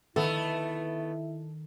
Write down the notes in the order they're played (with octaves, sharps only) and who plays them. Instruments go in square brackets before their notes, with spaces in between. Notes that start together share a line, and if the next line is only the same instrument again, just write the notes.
[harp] D#3 [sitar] A3 B3 [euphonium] E4 [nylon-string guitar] A4